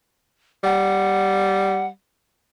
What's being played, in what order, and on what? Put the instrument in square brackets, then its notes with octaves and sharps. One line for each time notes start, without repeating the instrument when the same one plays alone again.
[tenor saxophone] G3 [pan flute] F#5